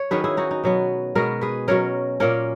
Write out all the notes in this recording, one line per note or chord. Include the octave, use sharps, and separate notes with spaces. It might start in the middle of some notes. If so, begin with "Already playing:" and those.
Already playing: C#5
D#3 F#3 C#4 G#4 B4
E4 G#4
D#4 F#4
D#4
B2 F#3 B3
B2 G#3 B3 F#4 A#4
G#4 B4
B2 F#3 C#4 A#4 C#5
A#2 A#3 C#4 A#4 C#5